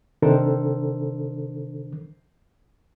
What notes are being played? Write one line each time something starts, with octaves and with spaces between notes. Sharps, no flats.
C3 D#3 D4 A4 A#4 C5